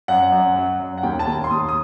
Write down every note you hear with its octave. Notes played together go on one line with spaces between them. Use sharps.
F#2 F#5
F#2
F#3
F#2
F#5
D#2 G5
A5
D#2
C6
D#2 D#6
D#6